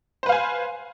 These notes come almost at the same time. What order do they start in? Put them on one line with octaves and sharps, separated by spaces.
C5 B4 F5 G#5